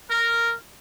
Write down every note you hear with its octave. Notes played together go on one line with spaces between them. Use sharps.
A#4